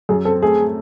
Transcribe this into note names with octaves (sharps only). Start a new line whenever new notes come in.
F#2 G#4
C4 A4
A3 G#4
A3